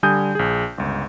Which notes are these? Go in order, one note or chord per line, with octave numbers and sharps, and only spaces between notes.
D3 G3 G#5 D#6 G6
A#1 G#4
G1 C#2